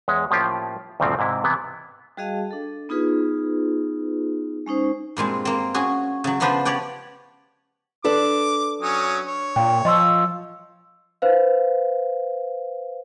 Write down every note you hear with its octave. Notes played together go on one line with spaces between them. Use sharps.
E2 G#3 C#5 E5
A2 F3 A#3 C#4 F4 G4
D2 G2 A#2 C#3 F3 C4
G#2 C3 E4
C3 E3 B3 E4
G3 F#4 G#4 D#5 F5 A5
D4 A4
B3 D#4 F4 G#4 B4
G#3 C#4 D#4 C5
G2 A#2 G#3 C4
A#3 C4
C#4 F#4 G#4
C#3 F#3
C#3 F3 B3 D4 B4 C5
G4 C#5 D5 F#5 G5
D4 A4 B4 D6
F#3 C#4 D#6
C#5
A#2 G5
F3 D#5 C6 E6
B4 C5 F5